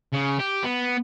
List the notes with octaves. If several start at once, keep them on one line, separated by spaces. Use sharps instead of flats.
C#3
G4
B3